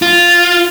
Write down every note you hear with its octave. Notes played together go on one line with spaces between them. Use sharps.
F4